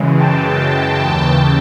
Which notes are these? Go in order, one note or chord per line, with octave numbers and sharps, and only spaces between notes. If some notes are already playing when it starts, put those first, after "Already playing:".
Already playing: F#2 C#3 E3 G#3
G5 A5
D#2 C#3 E3